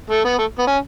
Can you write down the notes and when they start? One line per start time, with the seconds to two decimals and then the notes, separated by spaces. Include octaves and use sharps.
0.10 A3
0.24 B3
0.38 A3
0.58 B3
0.67 C#4